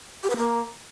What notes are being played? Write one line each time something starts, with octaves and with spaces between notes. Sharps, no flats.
G4
B4
A#3